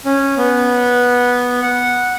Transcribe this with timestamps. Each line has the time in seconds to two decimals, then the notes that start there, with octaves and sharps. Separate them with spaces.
0.05 C#4
0.37 B3
1.62 F#5